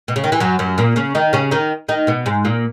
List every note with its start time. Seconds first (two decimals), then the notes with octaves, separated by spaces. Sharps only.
0.08 B2
0.16 C#3
0.24 D#3
0.32 E3
0.40 F#2 F#3
0.59 F#2 F#3
0.78 A#2 A#3
0.96 C#3 C#4
1.15 D#3 D#4
1.33 C#3 C#4
1.51 D#3 D#4
1.89 D#3 D#4
2.07 B2 B3
2.26 G#2 G#3
2.45 A#2 A#3